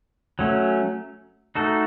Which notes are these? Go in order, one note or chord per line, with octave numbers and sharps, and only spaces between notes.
F#3 A3 C#4
A3 D#4 F#4 A4